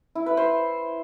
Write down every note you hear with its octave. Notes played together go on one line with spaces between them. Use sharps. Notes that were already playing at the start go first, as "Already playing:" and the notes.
E4
B4
C5